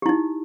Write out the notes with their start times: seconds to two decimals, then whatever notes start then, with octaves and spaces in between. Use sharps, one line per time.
0.02 G4
0.06 E4
0.09 D#4